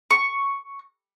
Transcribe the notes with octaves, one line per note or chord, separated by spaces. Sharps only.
C#6